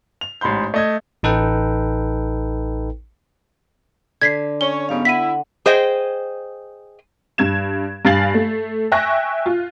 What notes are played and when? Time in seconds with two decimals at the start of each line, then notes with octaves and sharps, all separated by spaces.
0.21 F7
0.41 A1 G#2 B5 C6 G6
0.74 A3 D#5 G#6
1.23 A1 D#4 A4 B4 G5
4.22 D3 G#6 B6 C7
4.61 C#4 C#5 G7
4.89 G#2 G3 B3 C#4 F5
5.05 E4 F#5 B6 D#7
5.66 G#4 C5 D#5 G5
7.38 G2 G#6 E7
8.05 G2 F5 G#5 A6 C7 F#7
8.34 A3
8.92 E5 G5 G#5 C#6 F#6 A#6
9.46 F4